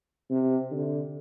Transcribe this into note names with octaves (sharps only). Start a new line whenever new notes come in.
C3
D3